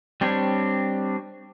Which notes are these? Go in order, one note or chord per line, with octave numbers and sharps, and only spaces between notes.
G3 C4 D4 C#5